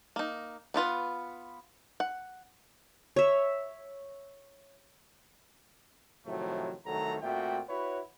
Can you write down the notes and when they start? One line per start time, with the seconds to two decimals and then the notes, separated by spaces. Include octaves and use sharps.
0.16 A#3 D#4
0.74 B3 D4 F4 B4
2.00 F#5
3.16 C#5 E5
6.27 A2 C3 D#3 F3 F#3 A3
6.86 C2 D#3 F#3 A3 A4 A#5
7.22 A#2 A3 C4 F#4 E5 G5
7.69 E4 F#4 B4 C#5